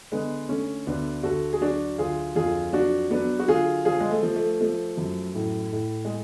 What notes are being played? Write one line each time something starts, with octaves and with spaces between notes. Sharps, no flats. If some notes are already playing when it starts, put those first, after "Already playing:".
D3 G#3 B3
D3 A3 C#4
D2 B3 D4
D2 F#4 A4
G#4
F#3 D4 F#4
D2 F4 G#4
F2 F4 G#4
F#3 D4 F#4
F#3 B3 D4
F#4
D3 F4 G#4
F3 F4 G#4
G#3
A3
F3
A3
F3 A3
F#2
A2
A2
G#3